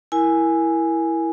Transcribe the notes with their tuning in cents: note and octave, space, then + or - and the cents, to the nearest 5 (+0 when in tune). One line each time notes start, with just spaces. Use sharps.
E4 +0 A#4 +0 G#5 +0